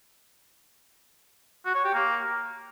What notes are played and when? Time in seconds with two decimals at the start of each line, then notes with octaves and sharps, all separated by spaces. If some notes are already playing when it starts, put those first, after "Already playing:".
1.65 F#4
1.75 C#5
1.85 G4
1.94 A#3